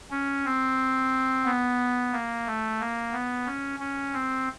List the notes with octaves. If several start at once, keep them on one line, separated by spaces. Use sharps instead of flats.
C#4
C4
B3
A#3
A3
A#3
B3
C#4
C#4
C4